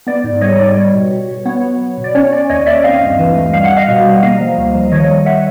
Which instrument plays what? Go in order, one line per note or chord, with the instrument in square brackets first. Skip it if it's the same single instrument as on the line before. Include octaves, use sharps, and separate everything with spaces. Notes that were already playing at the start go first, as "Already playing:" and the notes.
[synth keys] B3 D5
G#2
G3 C#5 D#5
G#2 D5
G3 C#5
B2
B2
B2
B3 C#5
F#3
F#3
B2
D5
C#4 C#5
C#4 D5
D#2 C#5 D#5
D#2 D5 E5
C4 D#5 F5
G2
E3
A3
G3 F5
F#5
G3
D#5 F5
B2
G3
A#3 D#5 F5
F3
D2
F3
D#3 C#5 D#5
G3
E5 F#5